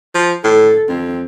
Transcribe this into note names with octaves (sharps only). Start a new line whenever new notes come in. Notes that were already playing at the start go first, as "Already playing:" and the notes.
F3
A2 A4
F2 C4